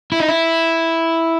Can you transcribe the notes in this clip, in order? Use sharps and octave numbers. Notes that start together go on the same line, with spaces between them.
E4
D#4
E4